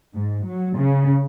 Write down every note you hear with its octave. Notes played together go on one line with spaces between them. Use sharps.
G#2
F#3
C#3